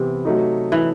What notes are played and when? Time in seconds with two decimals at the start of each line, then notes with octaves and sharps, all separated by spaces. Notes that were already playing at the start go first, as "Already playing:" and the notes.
Already playing: C3 E3 B3
0.25 F#3 A3 D#4
0.72 E3